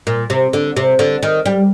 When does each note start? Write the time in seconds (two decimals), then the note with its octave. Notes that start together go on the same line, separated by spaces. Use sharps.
0.07 A#2
0.30 C3
0.53 D3
0.76 C3
0.99 D3
1.23 D#3
1.46 G3